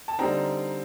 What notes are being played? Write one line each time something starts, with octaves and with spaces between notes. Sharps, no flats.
A5
D3 G3 C4 D#4 A#5